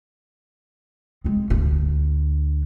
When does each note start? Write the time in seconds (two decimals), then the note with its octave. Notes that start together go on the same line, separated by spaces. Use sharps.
1.24 G#3 C4
1.50 D2 D4